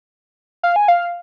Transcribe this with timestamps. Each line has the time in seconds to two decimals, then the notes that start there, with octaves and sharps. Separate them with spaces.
0.63 F5
0.76 G#5
0.88 F5